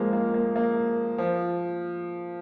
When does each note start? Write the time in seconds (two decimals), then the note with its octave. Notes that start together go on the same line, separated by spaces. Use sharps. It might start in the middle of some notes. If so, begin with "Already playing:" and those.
Already playing: F3 G#3 A#3
0.13 A#3
0.34 A#3
0.56 A#3
1.18 F3